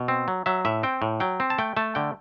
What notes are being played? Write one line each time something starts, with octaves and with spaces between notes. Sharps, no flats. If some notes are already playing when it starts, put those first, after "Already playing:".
Already playing: B2
C4
F#3
F#3 E5
A2 E5
C4 G5
A2
F#3 G5
C4
A5
A3 G5
A3 A5
D3 G5